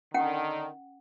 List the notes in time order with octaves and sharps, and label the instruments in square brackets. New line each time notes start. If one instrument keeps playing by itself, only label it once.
[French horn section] D3 D#3 [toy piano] C#4 F#5 G5